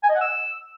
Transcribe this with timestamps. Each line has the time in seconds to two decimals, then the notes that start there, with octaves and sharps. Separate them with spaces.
0.03 G#5
0.09 D#5
0.15 F#5
0.21 E6